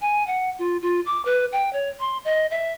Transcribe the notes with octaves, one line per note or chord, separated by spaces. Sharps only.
G#5
F#5
F4
F4
D6
B4
G5
C#5
C6
D#5
E5